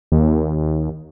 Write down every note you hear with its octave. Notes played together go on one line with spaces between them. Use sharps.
D#2